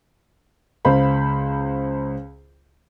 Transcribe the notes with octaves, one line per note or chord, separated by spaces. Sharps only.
C#2 C5 F5 B5